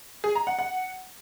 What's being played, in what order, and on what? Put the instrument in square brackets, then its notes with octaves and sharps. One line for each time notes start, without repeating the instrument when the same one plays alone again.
[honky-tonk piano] G#4
A#5
F#5
F#5